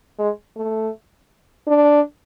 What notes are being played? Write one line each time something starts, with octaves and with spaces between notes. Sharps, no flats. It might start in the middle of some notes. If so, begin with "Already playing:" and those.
G#3
A3
D4